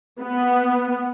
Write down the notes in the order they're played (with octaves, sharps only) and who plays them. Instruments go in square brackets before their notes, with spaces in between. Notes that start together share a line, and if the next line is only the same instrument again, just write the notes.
[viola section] B3